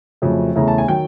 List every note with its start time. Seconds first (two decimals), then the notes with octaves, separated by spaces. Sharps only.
0.22 F2 C#3 F#3 A3
0.56 E2 C#3 E3 A3 A#5
0.68 A5
0.78 G#5
0.88 D#3 F#3 G5